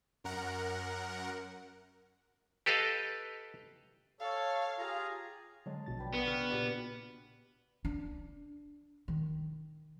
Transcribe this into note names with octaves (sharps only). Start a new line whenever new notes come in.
F#2 A#4 F#5
G4 A4 B4 D#5 F5
A4 C#5 F5
F4 G4 G#4 A#5
D3 F#3 G#3 A5
A#1 B2 A6
D4 B4 G5
B3 F#4
C#3 F6 B6
A#2 G4 D5
D4
D#3